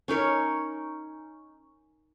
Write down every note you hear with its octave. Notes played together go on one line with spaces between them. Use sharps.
C#4 D#4 A#4 C#5